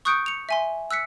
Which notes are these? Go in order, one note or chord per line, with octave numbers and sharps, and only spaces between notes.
C#6 D#6 F#6 G6 C#7 D7
C#7 F7
E5 G#5 C6
E6 F#6 B6 C#7